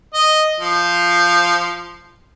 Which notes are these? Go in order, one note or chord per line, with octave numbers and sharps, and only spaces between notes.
D#5
F3